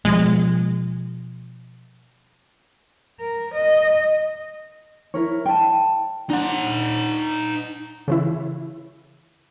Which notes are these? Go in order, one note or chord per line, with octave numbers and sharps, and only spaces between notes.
B2 F3 G#3
A#4
D#5
E4 A#4 C#5
G5 A5
D4 D#4 F#5
C#3 E3 E4